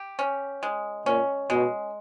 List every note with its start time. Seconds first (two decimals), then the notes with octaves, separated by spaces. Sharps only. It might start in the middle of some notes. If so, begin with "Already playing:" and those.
Already playing: G4
0.19 C#4
0.63 G#3
1.06 A#2 C#4
1.50 B2 G#3